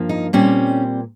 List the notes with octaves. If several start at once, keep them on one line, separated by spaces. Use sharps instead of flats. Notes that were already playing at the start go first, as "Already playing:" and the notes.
Already playing: G2 F3 A#3
D#4
A#2 G3 C4 C#4